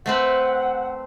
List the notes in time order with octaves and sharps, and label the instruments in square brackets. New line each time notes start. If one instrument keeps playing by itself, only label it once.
[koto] A3 C4 B4 [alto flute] F#5